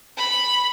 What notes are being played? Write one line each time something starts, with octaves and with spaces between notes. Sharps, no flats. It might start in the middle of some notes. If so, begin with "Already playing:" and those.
B5